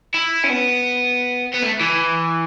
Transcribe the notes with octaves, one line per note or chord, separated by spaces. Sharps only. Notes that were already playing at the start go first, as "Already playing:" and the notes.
E4
C#4
B3
B3
A3
E3